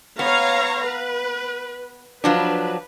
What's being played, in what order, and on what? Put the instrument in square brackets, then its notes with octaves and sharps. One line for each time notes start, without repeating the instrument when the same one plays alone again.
[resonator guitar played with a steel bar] B3 [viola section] C#5 F5 A#5
[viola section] B4
[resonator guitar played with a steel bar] F3 F#3 D4 [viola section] B4